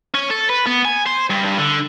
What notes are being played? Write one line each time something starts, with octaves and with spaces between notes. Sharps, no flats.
C#4
A4
B4
B3
G#5
C5
G2
G2
D3